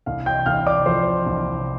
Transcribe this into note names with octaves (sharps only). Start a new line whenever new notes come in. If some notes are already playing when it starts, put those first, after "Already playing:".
C2 F5
G5 G6
C2 F5 F6
D5 D6
F3 C5 C6
C2